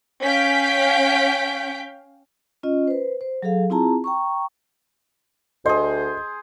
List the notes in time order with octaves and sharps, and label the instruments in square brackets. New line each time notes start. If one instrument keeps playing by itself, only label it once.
[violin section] C#4 F5 G5 G6 B6 D7
[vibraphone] C#4 F4 D#5
B4 C5
C5
F#3 G#4 A4 F5
C4 E4 F4 G#4 A5 A#5
G5 A#5 C#6
[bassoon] D2 [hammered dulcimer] G#4 C5 [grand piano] D#5